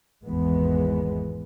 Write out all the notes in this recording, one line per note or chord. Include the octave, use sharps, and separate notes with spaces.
G#1 E2 E3 G#3 B3